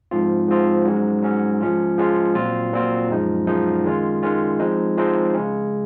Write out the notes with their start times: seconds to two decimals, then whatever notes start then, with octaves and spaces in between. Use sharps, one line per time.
0.11 G#2 F3 C4 F4
0.48 G#2 F3 C4 F4
0.86 G#2 F#3 C#4
1.23 G#2 F#3 C#4
1.61 F3 G#3 C#4 F4
1.98 F3 G#3 C#4 F4
2.35 A#2 F#3 C4 F4
2.73 A#2 F#3 C4 F4
3.11 F#2 F3 G#3 D#4
3.47 F#2 F3 G#3 D#4
3.84 D#3 G#3 C#4 F4
4.23 D#3 G#3 C#4 F4
4.59 F3 G#3 C4 D#4
4.97 F3 G#3 C4 D#4
5.34 C#3 G#3 C#4